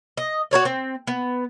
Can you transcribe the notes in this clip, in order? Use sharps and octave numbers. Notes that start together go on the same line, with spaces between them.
D#5
F#4 A#4 C#5 D5
C4
B3